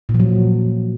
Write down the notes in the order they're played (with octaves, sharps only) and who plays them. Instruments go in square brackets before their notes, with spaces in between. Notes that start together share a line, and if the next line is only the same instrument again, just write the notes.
[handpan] A#2
F3
F#3